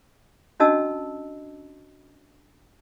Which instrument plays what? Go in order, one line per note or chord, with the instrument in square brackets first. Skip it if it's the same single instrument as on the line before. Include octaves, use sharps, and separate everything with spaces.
[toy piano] C#4 D4 F#4 D#5 A5 E6